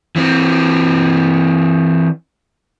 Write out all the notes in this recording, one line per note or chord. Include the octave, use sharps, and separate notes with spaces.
E3 C4